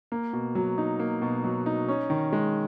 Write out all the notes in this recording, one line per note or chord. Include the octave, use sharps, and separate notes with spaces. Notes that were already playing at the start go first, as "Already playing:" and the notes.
A#3
B2
F#3
D#4
A#3
B2
F#3
D#4
C#4
D#3
G#3